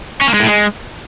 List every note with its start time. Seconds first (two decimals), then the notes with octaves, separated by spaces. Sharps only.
0.21 C#4
0.28 A#3
0.34 G#3
0.40 A2
0.46 G#3